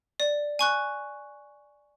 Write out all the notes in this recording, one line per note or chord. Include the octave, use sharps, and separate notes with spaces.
D5
G#5 C#6 F#6